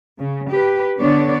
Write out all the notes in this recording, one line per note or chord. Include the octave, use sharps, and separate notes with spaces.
C#3
G4 B4
D3 B3 D4 C#5 D5